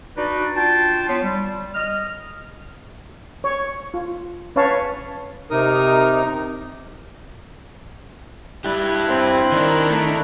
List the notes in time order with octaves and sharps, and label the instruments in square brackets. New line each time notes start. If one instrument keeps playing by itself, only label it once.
[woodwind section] D4 D#4 F#4 B4 D5
D4 F4 G5 A5
B3 F4 C#5
G3
D#5 F6
[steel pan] C#5
F4
C#4 B4 C#5 F5 A5
[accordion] C3 D#4 [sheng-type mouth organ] A#4 D#6
[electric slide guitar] G3 D4 G4 [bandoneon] E4 F#6
[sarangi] C4
[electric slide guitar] D#3 [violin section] D4 A#4
[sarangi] A3